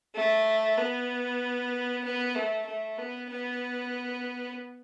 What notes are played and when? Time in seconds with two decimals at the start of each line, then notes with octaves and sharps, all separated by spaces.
0.15 A3
0.78 B3
2.04 B3
2.35 A3
2.66 A3
2.98 B3
3.30 B3